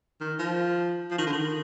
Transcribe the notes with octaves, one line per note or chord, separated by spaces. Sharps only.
D#3
F3
F3
D#3
D3
D#3